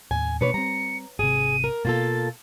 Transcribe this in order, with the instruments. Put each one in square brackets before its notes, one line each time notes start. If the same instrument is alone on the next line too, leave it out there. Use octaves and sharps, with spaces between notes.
[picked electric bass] D#2 A2 [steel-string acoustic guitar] G#5
[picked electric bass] B2 E3 A#3 [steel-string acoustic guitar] D4 B4 C#5 [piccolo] C#7
[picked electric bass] G3 C4 [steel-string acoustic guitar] A#5
[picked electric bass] G#1 C3 [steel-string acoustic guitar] G#4 [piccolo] D#7
[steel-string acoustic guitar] A#4
[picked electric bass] B2 [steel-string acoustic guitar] A#3 F4 A4 [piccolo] A6